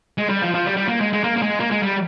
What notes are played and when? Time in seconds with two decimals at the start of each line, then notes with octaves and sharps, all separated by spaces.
0.18 G#3
0.29 G3
0.42 F3
0.54 F3
0.66 G3
0.77 G3
0.88 A#3
1.01 G#3
1.13 G#3
1.24 A#3
1.37 A#3
1.42 G#3
1.60 A#3
1.71 G#3
1.83 G3